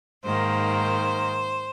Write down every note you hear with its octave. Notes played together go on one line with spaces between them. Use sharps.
G#2 D#3 A#3 C5